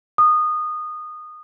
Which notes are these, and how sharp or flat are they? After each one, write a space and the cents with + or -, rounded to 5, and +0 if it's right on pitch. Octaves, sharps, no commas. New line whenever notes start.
D#6 -20